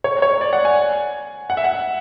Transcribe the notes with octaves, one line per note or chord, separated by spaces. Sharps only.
C#5
C#5
D5
F#5
G#5
F#5
E5
F#5